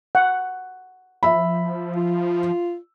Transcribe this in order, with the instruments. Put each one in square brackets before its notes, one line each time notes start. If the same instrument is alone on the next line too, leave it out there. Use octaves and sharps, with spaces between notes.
[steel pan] F#5
[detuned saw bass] F3 [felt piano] E5 B5
[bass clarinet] F4